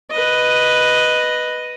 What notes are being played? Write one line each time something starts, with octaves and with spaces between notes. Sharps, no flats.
B4 D#5